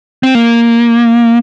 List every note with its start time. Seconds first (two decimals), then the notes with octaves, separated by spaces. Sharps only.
0.23 C4
0.35 A#3